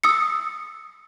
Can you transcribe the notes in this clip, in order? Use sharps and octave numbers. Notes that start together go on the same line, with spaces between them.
D#6 E6 C#7